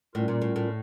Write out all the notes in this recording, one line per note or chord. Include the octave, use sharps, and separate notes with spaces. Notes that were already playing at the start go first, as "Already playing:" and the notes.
A2 G3 C#4 F4 A#4
A#2
A2
A2